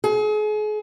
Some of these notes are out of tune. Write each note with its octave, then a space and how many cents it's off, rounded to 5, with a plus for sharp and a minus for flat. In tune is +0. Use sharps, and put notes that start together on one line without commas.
G#4 +40